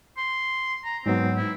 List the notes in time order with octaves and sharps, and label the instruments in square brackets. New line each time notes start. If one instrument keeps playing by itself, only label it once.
[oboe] C6
A#5
[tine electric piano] G#2 F#3 B3 [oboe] C4
[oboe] E4